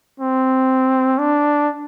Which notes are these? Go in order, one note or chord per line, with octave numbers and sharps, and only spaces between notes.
C4
D4